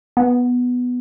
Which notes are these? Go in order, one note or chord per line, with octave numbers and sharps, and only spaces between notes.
B3